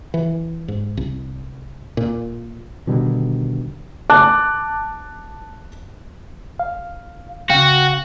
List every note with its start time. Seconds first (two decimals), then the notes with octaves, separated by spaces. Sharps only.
0.14 E3
0.68 G#2
0.97 C2
1.97 A#2
2.87 B2 D3 D#3 G3
4.10 A5 D6 F#6
6.59 F5
7.50 C#3 F#4 F5 G5